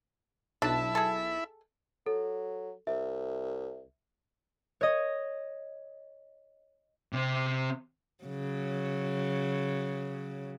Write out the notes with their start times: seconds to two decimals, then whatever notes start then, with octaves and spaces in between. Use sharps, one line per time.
0.62 B1 D4 E4 E5 A5 B5
0.95 G#4 A4
2.06 F#3 A4
2.87 C2 E5
4.81 C#5 D#5
7.13 C3 C4
8.24 C#3 F#3